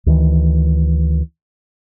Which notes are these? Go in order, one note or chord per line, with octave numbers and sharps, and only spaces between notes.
D2 D#3 E3